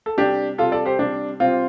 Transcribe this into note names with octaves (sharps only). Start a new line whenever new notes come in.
A4
C3 G3 D4 G4
C3 G3 F4 A4
A4 D5
G4 C5
C3 G3 D4
C3 G3 C4 F4